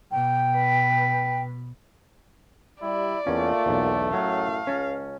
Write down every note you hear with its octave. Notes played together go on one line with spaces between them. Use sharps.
B2 G5
B4
G3 E4 D5
E2 A3 A#3 C#4 F4
B1 E2
A1 F#2 A2 F#3 F5
C#2 C#4 A5